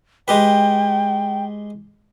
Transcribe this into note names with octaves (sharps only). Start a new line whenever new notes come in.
G#3 G4 B4 G5